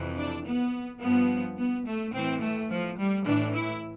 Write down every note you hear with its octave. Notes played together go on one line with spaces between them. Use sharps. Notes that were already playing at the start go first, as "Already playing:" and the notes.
Already playing: F2 C3 E3
D4
B3
G2 F3 B3
B3
A3
A2 E3 C4
A3
F3
G3
A2 E3 D4
E4